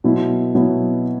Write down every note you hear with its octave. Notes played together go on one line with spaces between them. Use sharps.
B2 F#3 B3 E4
B2 F#3 B3 E4